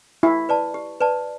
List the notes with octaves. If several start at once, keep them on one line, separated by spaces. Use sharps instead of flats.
E4 G4
B4 D5 A5
G4
B4 D5 A5